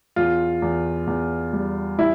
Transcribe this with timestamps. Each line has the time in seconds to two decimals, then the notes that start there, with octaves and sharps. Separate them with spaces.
0.16 E2 F4
0.62 E2
1.07 E2
1.53 G3
1.98 G3 E4